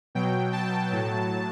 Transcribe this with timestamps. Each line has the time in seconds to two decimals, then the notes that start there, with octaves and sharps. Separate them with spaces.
0.15 B2 F#3 G5
0.53 A5
0.90 A2 F#3